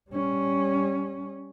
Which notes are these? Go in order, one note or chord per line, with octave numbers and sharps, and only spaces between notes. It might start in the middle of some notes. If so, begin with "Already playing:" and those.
G3 C#4